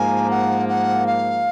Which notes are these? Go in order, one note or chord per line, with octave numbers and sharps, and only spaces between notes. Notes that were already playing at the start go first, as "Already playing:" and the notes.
Already playing: G#2 F3 A#3 G#5
F#5
F#5
F5